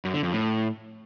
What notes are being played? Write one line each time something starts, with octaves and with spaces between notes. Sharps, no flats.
F#2
D3
F2
A2